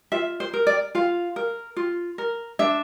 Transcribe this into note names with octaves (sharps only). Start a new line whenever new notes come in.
F4 E5
C5
A#4
D5
F4 F5
A#4
F4
A#4
D4 E5